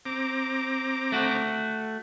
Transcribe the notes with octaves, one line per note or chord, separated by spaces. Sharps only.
C4 A#5 D6
A3 F#4